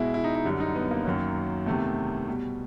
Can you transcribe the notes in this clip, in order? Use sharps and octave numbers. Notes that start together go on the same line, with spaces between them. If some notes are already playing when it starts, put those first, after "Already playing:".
Already playing: B2 G#3 E4
E4
D#4
D#4
F#2 D3 G3
D#4
B3
A#3
F#2 D#3 F#3
E2 C3 D#3 A3
B2 G3